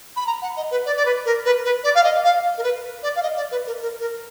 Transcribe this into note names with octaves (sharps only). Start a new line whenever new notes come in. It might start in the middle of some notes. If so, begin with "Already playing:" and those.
B5
A#5
F#5
D#5
B4
D5
D5
B4
A#4
B4
B4
D5
F5
D#5
F5
A#4
B4
D5
F5
D#5
D5
B4
A#4
A#4
A#4